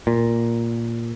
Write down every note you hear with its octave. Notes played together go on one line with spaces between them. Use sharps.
A#2